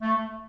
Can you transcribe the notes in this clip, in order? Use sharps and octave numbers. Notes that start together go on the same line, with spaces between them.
A3